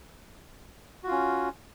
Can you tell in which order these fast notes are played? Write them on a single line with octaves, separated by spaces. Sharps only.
F#4 F4 C#4